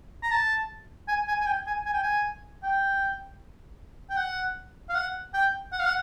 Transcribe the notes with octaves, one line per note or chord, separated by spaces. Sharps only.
A#5
A5
G#5
G#5
G#5
G5
G#5
G#5
G5
G#5
G5
G5
F#5
F5
F#5
G5
F#5
F5
F#5